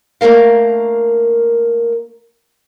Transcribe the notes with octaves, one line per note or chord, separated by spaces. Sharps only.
A3 A#3 D4 A#4 F5